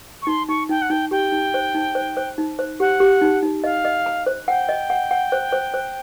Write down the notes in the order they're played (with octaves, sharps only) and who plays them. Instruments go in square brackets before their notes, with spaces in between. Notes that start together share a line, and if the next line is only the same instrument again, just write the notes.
[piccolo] C#6
[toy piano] D#4 [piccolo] C6
[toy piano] D#4 [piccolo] C#6
[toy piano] D#4 [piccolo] G5
[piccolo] F#5
[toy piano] D#4 [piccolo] G5
[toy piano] G4 [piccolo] G5
[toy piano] D#4
C5
D#4
C5
C5
D#4
C5
[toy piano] G4 [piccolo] F#5
[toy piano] G4
D#4
D#4
[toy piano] D#5 [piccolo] F5
[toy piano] D#5
A#5
C5
[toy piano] F#5 [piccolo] G5
[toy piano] D#5
F#5
F#5
C5
C5
C5